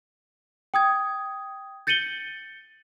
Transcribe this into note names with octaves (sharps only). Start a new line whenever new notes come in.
G5 D#6 G#6
G6 A6 C#7 D#7 F#7 G7